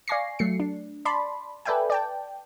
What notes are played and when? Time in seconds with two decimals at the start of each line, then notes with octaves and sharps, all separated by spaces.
0.08 D5 F5 G#5 C#6 A#6 C7
0.39 F#3 A3 C7 C#7
0.60 D4
1.05 D5 A5 B5 C6
1.65 A4 B4 D5 E5 G5 G#5
1.90 D5 G5 A5